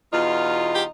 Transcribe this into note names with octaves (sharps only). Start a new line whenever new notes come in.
E2 B2 D#4 F4
G4